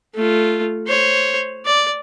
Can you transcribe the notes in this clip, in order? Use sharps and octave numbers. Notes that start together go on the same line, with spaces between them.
A3 F4
C5 C#5
D5